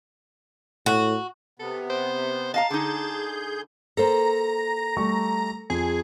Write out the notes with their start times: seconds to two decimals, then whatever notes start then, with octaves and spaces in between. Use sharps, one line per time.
0.86 A2 F#4
1.59 C3 B3 A4
1.90 C5
2.54 D#5 F5 A5 A#5
2.71 D3 D#4 G#4 G6
3.97 A#3 A4 A#4 C5 A#5
4.97 G3 A3 C#6
5.70 F2 G#4